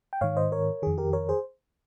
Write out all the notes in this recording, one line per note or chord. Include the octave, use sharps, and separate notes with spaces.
G5
G#2 D#3 C#5 F5
C5 D#5
A#4 C#5
F2 D#3 G#4
G4 A#4
A#4 C#5
G#4 C5